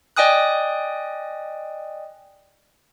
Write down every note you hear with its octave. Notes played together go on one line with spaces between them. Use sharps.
D5 D#5 G5 G#5 D#6 F#6